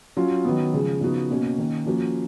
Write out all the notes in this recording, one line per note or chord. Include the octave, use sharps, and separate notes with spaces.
F#3 C#4 F4
D#3 F#3 B3
C#3 F3 G#3
C#3 F3 B3 D#4 F#4
B2 A#3 C#4 F#4
D#3 A#3 C#4
F3 A#3 C#4 F#4